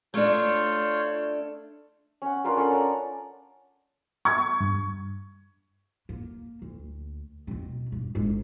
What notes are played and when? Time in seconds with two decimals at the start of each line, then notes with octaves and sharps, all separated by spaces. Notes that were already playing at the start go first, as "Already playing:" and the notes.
0.14 A3 D4 F4 C#5 G6
2.22 C#4 F#5
2.44 D4 F4 A#4 B4
2.57 C#4 A4 F#5 B5
2.69 D5 A#5
4.25 C#6 G#6
4.60 G2
6.09 A#3
6.62 D2
7.47 B2 C4
7.92 G2
8.15 G1 G#2